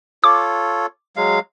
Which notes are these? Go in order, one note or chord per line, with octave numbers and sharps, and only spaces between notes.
F4 A4 C#5 D6
F#3 G#3 F5